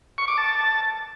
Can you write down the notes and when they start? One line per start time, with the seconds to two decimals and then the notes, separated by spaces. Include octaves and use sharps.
0.18 C#6
0.28 D6
0.38 A5